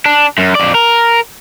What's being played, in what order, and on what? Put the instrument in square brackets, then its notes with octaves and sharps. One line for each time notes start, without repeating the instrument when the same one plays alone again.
[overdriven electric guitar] D4
F#2
F2 D5
A#4